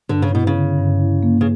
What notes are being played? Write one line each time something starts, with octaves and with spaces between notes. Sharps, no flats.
G2 D3
C#3
B2 E4
C#3
D3
G2
E4
A#3
C#3